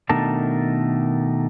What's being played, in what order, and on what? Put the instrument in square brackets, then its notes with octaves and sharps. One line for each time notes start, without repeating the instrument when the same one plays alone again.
[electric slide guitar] B2 D#3 A3 D4 A#4 A5